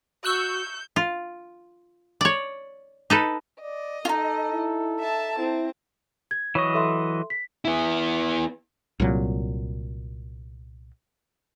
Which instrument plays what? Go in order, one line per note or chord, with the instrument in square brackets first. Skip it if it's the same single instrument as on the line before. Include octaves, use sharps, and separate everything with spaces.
[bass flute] F#4 [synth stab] C#6 E6 F#6 [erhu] G6
[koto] F4
C#5 D5
D#4 A4 B4
[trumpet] D5 [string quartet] D#5
[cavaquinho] D#4 F4 [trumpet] A4
[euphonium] E4
[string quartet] E5 A5
[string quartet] C4 [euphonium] E4
[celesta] G#6
[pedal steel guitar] E3 F#3 D#5 [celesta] C#5 C#6
[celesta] A4 E5 C6
B6
[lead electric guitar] B3 E4
[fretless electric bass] C2 A#2 F#3